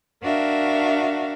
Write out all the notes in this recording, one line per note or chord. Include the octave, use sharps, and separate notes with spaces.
D4 F#4 A#4 E5 F5